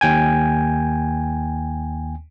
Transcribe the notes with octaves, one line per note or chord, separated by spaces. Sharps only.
D#2 G5 G#5